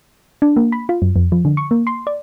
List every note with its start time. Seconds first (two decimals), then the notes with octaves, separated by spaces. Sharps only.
0.42 D4
0.56 A#3
0.72 B5
0.89 F4
1.02 F#2
1.16 F2
1.32 F3
1.45 D3
1.57 C#6
1.71 A#3
1.87 C6
2.07 D5